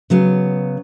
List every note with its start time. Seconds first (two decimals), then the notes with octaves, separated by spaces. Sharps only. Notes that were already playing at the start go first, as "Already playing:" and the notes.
0.10 C#3 F#3 B3